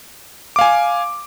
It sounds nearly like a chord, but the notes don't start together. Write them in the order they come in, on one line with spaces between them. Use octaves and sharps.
D6 F5 G#5